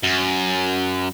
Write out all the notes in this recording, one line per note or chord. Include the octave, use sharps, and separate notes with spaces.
F#2